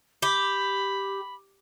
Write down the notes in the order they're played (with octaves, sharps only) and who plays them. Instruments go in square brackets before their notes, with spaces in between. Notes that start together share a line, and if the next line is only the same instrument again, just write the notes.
[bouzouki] G4 [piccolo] B5